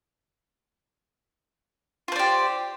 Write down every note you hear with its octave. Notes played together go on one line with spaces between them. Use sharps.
F4 G4 C5 D5